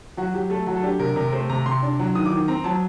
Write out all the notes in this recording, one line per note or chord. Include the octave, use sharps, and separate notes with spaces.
F#3 F#4
F#3 G4
A3 A4
F#3 F#4
A4
D4 G4
C3 A#4
C3 A#4
A3 C5
C3 A#5
C3 C6
D4
F#3
D#3 D#6
D6
D#3
C4 A#5
F#3 A5